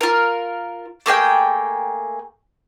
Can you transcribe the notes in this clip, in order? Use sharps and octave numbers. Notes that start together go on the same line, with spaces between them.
F4 A#4
A3 A#3 G#4 G5